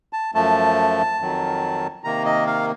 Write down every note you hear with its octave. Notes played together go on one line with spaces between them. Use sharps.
A5
F#2 F3 A3 A5
F2 D#3 F#3
C3 D#3 A#3 A#5
D#5
F5